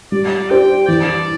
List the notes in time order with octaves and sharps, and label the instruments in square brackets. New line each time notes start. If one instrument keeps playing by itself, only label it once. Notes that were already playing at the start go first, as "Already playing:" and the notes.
[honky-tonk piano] G3 [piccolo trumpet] D5
[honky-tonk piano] D4 G4 C5 [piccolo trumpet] G5
[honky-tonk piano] E3 [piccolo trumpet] D5